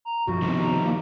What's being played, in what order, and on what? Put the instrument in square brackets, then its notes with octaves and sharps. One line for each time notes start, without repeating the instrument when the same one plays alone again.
[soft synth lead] A#5
[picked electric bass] B1 G2 F3 [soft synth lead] F#4
[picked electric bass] C3 B3 [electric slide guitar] D#3 F3 G3
[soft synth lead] A#5
A#3